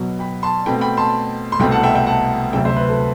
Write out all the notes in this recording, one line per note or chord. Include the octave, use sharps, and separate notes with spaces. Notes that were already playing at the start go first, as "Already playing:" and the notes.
Already playing: B2 F#3 B3
G5 B5
A5 C6
B2 A3 C4 G5 B5
G5 B5
A5 C6
C6
C2 B2 A3 C4 G5 B5
F#5 A5
E5 G5
E5 G5
F#5 A5
D2 C3 F#3 C4 E5 G5
C5 E5
B4
A4